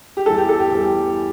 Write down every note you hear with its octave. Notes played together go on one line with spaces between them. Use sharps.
G4
E2 E3 G3 A4
G4
A4
G4
E2 E3 G3